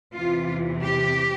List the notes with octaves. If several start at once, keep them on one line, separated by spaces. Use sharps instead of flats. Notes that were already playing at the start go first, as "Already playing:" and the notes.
E2 C3 E3 F4
G4